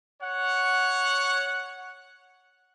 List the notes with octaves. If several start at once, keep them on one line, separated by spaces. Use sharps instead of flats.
C#5 F#5